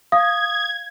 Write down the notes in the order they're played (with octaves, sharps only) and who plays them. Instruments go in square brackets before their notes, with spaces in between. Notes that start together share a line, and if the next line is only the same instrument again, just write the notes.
[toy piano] F5 [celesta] D#6 [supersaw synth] G#6